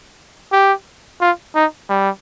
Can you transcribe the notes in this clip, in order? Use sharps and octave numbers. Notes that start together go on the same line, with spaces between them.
G4
F4
D#4
G3